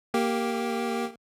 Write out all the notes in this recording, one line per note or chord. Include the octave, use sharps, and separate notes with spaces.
A#3 G4